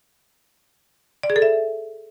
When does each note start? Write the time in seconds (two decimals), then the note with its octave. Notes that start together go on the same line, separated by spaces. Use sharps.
1.23 D5
1.30 G#4
1.36 A4
1.42 E5